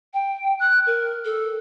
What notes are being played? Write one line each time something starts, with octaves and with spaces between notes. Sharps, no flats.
G5
F#6
A#4
A4